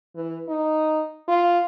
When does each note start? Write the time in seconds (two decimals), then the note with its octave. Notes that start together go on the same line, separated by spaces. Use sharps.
0.16 E3
0.48 D#4
1.28 F4